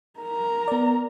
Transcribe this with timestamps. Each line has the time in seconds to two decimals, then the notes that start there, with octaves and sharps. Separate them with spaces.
0.20 A#4 A#5
0.68 B3 D5